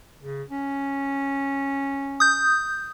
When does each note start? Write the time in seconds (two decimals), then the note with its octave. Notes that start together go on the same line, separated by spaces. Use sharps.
0.22 C#3
0.50 C#4
2.20 D#6 G6